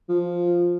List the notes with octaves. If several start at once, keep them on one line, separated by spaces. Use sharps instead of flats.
F3